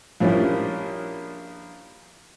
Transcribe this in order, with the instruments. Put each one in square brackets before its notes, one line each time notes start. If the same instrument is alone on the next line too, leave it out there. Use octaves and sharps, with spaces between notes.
[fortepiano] A#1 A#2 F3 G3 C#4 E4